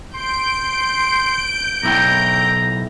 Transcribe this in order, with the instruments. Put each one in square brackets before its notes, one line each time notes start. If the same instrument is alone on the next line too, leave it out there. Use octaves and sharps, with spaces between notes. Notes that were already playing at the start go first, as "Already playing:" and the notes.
[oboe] C6 [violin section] G6 D7
[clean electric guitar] B1 E4 G5 [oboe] A#5